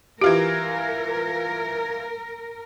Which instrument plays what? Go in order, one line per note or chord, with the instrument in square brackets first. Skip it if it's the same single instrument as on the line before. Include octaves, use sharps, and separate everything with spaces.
[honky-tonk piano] E3 F4 D7 [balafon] G4 [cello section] A#4